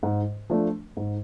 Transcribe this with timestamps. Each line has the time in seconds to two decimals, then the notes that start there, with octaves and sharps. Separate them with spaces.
0.03 G#2
0.50 F3 A3 D4
0.97 G#2